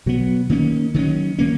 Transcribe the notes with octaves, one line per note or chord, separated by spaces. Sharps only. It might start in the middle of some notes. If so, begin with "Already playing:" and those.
B2 F#3 B3
D#3 A#3 C#4
D#3 F#3 C#4
D#3 A#3 C#4